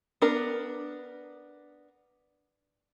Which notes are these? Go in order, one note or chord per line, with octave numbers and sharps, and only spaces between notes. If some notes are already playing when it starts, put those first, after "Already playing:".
B3 D4 A#4